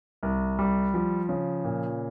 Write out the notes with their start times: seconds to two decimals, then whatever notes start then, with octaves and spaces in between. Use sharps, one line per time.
0.23 C2
0.59 G3
0.94 F3
1.29 C#3
1.64 A#2